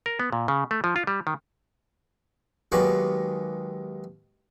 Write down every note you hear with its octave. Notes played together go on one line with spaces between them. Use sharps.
A#4
B3
A#2
C#3
A3
F3
F4
G3
D#3
D#2 F#3 G#3 B3 C#6 D6